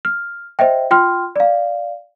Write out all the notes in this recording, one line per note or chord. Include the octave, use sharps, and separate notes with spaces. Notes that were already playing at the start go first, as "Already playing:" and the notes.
F6
C5 D#5 E5 G5
F4 G5 C6 F6
D5 F5